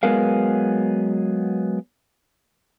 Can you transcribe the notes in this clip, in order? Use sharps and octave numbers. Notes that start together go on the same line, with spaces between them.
F#3 G#3 B3 G#4 A#4 F5